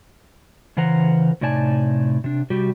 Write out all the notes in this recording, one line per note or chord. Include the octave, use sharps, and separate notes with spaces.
C#3 E3 A#4 C5 F#5 A#5
A2 C3 D#4 D5 G#5 A5
C3 D4
C3 G3 F#4 G4